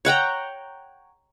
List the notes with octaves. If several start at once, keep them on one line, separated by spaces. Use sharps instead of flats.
C#5 F#5 G5 A#5